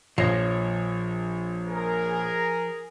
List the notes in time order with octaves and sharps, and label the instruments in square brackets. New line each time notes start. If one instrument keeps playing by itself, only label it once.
[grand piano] A#1 C#5 A#6 [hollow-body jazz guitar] F3
[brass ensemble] G#4 A#4